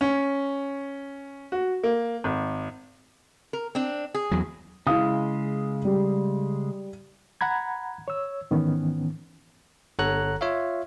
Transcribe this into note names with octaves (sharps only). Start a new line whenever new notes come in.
C#4
F#4
A#3
G#1
A#4
C4 D4
G#4
E2 F#3
C#3 G#3 E4 F5 D#6
G3
F#5 A#5 B5 G#6
C#5 E6
G#2 D#3 E3 B3 C#4
G1 A4 C#5 F#5 A#5 F#6
F4 C#5 E5 F5